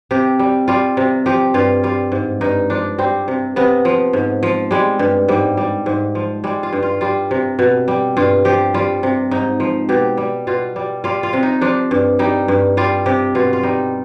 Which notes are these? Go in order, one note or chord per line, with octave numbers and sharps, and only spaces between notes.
C3 G4
G3
G3 F4
C3
F3 G4
G2 F4
G3 F4
G#2
G2 D#4
F3 D4
G3 C4
C3
C3 B3
F3
G#2
F3
G3 G#3
G2
G#2 G3
G3
G#2
F3
G3 G#3
F4
G2
F4
G3 F4
C3
B2
G3
G2 F4
F3 G4
G3 F4
C3
G#2 D#4
F3
B2 G4
G3
B2 F4
G3
G3 F4
F4
C3
D#4
F3 D4
G2
G3 D#4
G2
G3 F4
C3 G4
B2 F4
F4
G3 D#4